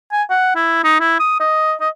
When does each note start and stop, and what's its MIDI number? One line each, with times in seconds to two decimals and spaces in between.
0.12 0.23 80
0.30 0.53 78
0.56 0.82 64
0.84 0.97 63
1.00 1.19 64
1.20 1.37 87
1.40 1.74 75
1.80 1.89 75